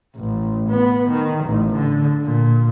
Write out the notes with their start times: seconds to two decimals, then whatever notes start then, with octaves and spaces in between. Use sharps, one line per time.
0.16 A1
0.69 B3
1.10 D#3
1.44 A1
1.76 D3
2.24 A#2